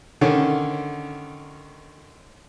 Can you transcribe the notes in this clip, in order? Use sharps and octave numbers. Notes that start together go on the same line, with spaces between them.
D3 D#3 C#4